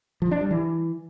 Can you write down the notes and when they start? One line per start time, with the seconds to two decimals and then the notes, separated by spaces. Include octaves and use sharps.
0.22 F3
0.31 D4
0.41 G3
0.51 E3